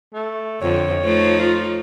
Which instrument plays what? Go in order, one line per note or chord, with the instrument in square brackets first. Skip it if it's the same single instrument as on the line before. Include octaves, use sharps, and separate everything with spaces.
[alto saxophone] A3
[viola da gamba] F2 D3 [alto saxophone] C#5
[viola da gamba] F3 A3 D#4
[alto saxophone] F4